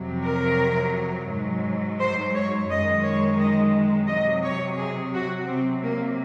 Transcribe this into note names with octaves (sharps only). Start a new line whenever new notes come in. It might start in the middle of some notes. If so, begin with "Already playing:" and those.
Already playing: F2 C3 F#3
A#4
G#2 F#3
C5
C#5
F#2 D#3 G#3 D#5
C#5
D#5
C3 F#3 D#5
C#5
G#4
F#4
C3 F#3 C4
A#3